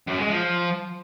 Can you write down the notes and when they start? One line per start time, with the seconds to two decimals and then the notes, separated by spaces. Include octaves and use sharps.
0.07 F#2
0.18 G#3
0.29 F3